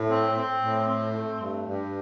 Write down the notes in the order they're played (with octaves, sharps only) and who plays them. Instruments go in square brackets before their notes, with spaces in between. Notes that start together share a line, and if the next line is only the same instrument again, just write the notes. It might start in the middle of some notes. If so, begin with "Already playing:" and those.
Already playing: [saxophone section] A2
C4
C4
A2
C4
A3
G2
G2